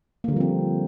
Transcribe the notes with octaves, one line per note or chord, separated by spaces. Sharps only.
D3 F3 G3 A#3 C4